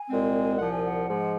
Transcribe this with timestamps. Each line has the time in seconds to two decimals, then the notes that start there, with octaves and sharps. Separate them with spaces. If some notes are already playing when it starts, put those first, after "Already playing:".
Already playing: G#5
0.10 C2 A#2 G#3 C4
0.59 C2 A#2 F3 F#5
0.71 G#5
0.84 F#5
1.08 G#2 F3 G#3